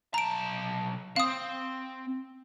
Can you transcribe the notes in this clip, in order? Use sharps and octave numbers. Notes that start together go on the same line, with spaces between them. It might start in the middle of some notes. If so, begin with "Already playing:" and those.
B1 A5 A#5 D7
C4 F5 D#6